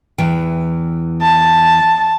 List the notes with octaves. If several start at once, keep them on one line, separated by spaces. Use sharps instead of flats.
E2 E3 G5
A5